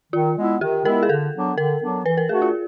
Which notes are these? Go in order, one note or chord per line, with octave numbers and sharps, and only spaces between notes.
D#3 F4
G#3 B3 E4
D#3 G4
G#3 B3 E4 A#4
G#4
D3 A4
F#3 B3 D4
D3 A#4
F#3 B3 D4
E3 B4
A#4
A3 D4 F#4 G#4
F4